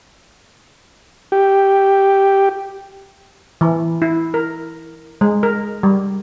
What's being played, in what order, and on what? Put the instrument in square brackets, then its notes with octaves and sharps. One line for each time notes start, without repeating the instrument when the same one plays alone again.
[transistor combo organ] G4
[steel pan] E3
E4
A#4
G#3
A#4
G3